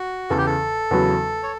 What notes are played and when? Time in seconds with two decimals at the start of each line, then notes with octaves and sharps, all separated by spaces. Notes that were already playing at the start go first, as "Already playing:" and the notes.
Already playing: F#4
0.30 E2 C#3 E3 A4
0.38 G4
0.46 A4
0.91 E2 C#3 F#3 B3 F#4
1.43 C#5